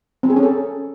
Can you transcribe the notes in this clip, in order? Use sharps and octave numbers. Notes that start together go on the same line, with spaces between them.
C4
G#4
C#4
A4